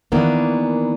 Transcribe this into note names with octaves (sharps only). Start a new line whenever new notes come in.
D#3 E3 A#3 B3 D4